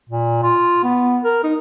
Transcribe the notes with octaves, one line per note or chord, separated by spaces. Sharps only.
A#2
F4
B3
A#4
D#4